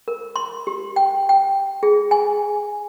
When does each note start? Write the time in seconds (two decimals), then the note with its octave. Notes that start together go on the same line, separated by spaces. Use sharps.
0.08 A#4
0.36 C6
0.67 G4
0.96 G5
1.29 G5
1.83 G#4
2.11 G#5